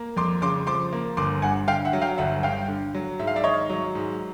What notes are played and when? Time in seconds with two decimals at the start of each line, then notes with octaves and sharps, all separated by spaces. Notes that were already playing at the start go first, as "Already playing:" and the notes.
Already playing: A#3
0.16 F2 C6 D6
0.42 C#3 C6 D6
0.67 F3 C6 D6
0.93 A#3
1.17 G1 C6 D6
1.42 G2 F#5 G#5
1.68 D3 F5 G5
1.85 E5 F#5
1.93 F#3
2.02 F5 G5
2.18 G1 E5 F#5
2.43 G2 F5 G5
2.68 D3
2.94 F#3
3.19 G#2 E5
3.27 F5
3.36 D5 E5
3.44 D#3 C#5 D#5
3.69 F#3
3.95 G#2